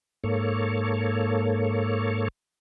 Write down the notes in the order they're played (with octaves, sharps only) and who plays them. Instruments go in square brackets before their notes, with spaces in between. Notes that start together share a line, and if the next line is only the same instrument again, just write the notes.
[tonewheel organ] G#2 A#3 A4 C#5